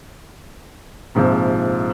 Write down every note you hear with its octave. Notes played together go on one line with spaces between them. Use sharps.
A#1 G#2 C3 F3